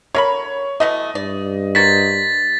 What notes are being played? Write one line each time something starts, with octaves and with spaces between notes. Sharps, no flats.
D3 A#4 C#5 B5
B2 E3 A3 D#5
G2 D5
F#4 A#4 C5 A6 B6